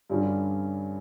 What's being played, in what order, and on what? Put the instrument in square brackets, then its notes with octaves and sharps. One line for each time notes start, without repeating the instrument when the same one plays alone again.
[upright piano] G2 D3 G3 C#4